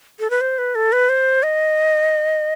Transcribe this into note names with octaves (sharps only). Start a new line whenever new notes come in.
A4
B4
C5
B4
A4
B4
C5
D#5